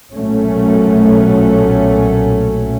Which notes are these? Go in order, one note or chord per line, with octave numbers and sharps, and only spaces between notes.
B1 A#2 F#3 A3 C#4